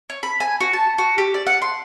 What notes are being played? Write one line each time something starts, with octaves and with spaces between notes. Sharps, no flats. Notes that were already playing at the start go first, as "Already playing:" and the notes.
C#5
B5
G#5
F#4
A5
F#4
G4
D5
F#5
C6